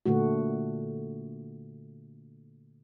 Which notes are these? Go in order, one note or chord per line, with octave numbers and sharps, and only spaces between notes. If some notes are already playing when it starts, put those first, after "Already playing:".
A#2 D3 A3 F#4